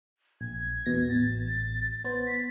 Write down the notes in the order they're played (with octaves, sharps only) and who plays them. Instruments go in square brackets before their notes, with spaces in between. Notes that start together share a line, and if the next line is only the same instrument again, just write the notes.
[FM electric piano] A#1 [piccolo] G#6
[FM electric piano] E2 B2 A#6
[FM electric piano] A1 [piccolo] A6
[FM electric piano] B3 C5
[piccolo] B6